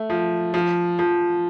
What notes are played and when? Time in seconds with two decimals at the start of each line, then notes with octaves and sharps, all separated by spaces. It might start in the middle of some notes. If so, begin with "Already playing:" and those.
Already playing: A3
0.10 F3
0.54 F3
0.99 F3